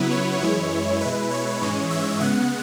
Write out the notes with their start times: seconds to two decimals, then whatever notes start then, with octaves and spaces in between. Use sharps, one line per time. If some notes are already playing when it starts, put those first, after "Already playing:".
Already playing: C#3 F#3 B3 E4 B4
0.11 C#5
0.41 F#2 E3 G#3 E4
0.70 C#5
1.01 B2 G#3 E4 B4
1.31 C#5
1.61 G#2 E3 G#3 C#4
1.91 E5
2.20 C#3 G#3 B3 F#5